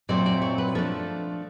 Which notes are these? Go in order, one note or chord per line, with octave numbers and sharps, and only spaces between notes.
A#2 F#3 A3 C4 D5
D5
C#5
B4
F3 A3 D4 A4